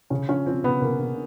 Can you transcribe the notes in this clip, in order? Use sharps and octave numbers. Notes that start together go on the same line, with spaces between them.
C#3 C#4
F3 C#4
F3 C4
C#3 B3
C#3 A#3
C#3